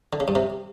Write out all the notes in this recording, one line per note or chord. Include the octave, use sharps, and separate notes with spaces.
D3
C#3
G2
C3